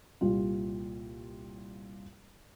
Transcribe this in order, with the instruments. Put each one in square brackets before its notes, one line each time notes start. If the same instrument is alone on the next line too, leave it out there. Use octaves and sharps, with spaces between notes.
[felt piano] C2 A#2 G3 F4